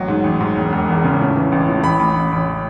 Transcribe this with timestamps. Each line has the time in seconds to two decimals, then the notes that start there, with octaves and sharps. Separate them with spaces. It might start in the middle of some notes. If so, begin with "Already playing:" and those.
Already playing: A1 F#3
0.08 G#2
0.24 A1
0.40 G#2
0.56 E1
0.73 E1
0.88 E2
1.04 C#3
1.20 A2
1.36 E3
1.52 A1
1.68 A2
1.83 A1 B5
1.99 A1
2.16 A1
2.32 A1